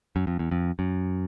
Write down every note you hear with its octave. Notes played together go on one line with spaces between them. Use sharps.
F#2
F2
E2
F2
F#2